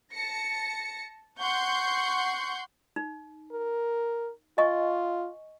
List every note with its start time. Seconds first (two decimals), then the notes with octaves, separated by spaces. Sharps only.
0.13 A5 A#6 C#7
1.40 F#5 C6 C#6 G6
2.96 D#4
3.52 A#4
4.58 F4 D#5 G#5 C#6